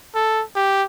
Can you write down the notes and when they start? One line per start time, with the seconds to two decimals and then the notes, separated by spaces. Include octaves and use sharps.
0.15 A4
0.56 G4